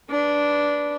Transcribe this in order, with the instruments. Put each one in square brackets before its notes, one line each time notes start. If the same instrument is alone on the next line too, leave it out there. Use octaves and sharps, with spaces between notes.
[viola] D4 B4